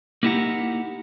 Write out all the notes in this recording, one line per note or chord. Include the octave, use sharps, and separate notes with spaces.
A#3 D#4 E4 G4 F#5 A#5